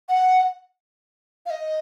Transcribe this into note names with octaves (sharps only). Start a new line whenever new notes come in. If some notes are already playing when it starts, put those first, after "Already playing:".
F#5
F5
D#5